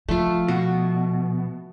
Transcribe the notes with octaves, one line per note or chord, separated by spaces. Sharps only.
F3 A3 F4
B2 F#4